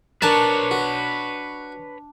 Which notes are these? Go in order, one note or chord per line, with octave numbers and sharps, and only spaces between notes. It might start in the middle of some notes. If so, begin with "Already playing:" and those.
D4 A#4 B4 C#5 G#5 A5
F#4